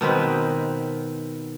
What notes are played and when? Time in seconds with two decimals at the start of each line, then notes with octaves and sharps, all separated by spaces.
0.01 B2 D#3 C4 B4